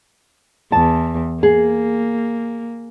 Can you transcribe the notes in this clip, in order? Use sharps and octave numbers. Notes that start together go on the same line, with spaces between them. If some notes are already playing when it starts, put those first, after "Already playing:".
E2 A5
A#3 G#4